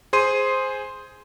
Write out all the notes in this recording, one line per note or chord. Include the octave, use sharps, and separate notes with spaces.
G#4 C5 C6 D#7